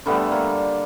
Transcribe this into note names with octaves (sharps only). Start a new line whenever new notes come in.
D3 G3 A3 B3
A#3